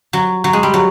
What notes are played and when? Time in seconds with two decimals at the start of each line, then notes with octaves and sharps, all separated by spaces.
0.13 F#3
0.44 F#3
0.53 G#3
0.63 G3
0.74 F#3